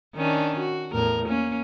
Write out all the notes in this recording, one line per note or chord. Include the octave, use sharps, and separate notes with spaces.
D#3 C#4 D4
F#4
E2 A2 A#4
A#3 C#4